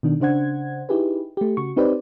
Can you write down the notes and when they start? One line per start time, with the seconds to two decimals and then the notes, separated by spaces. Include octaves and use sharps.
0.03 B2 D#3 D4
0.20 C#3 D4 C5 F#5 G#6
0.89 D#4 E4 G4 G#4 B4
1.37 A3 G4
1.57 C#3 F#4 C#6
1.76 C4 D#4 G4 B4 C5 D5